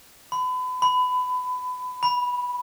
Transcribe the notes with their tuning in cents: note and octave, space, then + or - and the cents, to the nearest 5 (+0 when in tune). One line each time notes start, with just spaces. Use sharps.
B5 +35
B5 +25
B5 -10